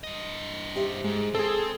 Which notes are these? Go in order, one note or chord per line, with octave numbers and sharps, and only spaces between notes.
G2 D#5
G4 C5 E5
G#2 G#3
C4 G#4 A4